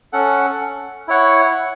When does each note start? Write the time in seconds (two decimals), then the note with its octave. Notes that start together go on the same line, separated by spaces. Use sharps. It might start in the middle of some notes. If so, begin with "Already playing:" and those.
0.13 C#4 A4 F#5
1.08 E4 C#5 F#5